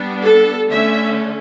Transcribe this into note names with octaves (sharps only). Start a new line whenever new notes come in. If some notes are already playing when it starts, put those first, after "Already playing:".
Already playing: G3 B3 D4
A4
D3 A3 C#4 E5